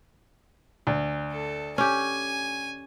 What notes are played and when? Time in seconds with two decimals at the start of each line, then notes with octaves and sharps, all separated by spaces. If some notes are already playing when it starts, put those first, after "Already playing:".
0.87 D2
1.32 A4
1.78 C#4 G4 G#5